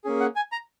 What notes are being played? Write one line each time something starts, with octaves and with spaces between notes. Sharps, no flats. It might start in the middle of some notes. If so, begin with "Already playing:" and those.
A#3 C#4 G#4
F#5
G#5
A#5